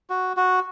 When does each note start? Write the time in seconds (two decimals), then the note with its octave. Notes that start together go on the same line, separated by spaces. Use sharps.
0.10 F#4
0.37 F#4